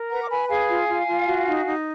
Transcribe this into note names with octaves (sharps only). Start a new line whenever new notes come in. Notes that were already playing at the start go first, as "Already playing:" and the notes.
Already playing: A#4
B4 F#5 A#5
D6
B4 G#5 B5
G#4 F5 G#5
F4
F4
F4
F#4
D#4
D#4